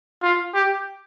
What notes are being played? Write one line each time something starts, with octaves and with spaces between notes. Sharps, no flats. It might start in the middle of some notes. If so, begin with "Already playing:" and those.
F4
G4